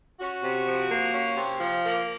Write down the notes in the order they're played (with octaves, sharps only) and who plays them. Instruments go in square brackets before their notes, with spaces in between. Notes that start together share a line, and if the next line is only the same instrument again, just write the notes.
[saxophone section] C#4 F#4
C3
F3
A#3
C#4
C3
F3
A#3